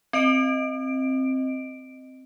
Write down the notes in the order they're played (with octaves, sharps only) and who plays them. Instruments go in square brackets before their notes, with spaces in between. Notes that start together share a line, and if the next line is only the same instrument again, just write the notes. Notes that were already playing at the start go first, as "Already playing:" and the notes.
[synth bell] C4 D#5 D7